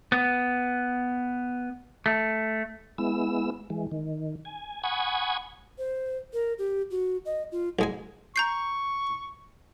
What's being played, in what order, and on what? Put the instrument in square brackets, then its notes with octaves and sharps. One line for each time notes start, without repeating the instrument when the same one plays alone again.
[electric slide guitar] B3
A3
[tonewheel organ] G#3 B3 E4 E6
E3 G#3
D#3
G#5
F#5 G#5 B5 C#6 D#6 G#6
[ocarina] C5
A#4
G4
F#4
D#5
F4
[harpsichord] B1 G#3 G#5
[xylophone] A#5 G6 C7 [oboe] C#6